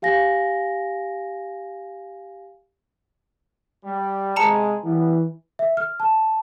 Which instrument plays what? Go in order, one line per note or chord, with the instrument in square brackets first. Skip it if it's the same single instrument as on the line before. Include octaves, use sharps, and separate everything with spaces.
[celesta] G4 F5 G#5 A#6
[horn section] G3
[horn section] C3 G#3 [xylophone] A5 A#5 C#7
[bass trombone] E3 [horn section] F#3 G3 B3
[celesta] E5
F6
A5